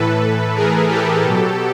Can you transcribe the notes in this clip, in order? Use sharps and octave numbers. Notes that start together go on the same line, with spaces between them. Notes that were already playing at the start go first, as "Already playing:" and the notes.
Already playing: A2 E3 A4 B4
G#4 A#4
G4 A4
B2 F#3